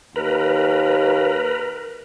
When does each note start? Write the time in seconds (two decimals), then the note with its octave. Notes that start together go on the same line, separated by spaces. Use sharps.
0.16 D#2 A#4 B4